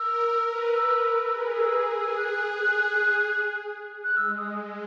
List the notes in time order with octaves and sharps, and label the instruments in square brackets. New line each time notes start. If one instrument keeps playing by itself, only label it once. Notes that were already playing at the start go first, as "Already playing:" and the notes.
Already playing: [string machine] A#4 [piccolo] E6
[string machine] A#4
B4
[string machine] B4 [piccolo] E6
[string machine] B4
G#4
[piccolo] E6
E6
F#6
F#6
[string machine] G#3 [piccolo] E6
[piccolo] D#6
[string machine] G#3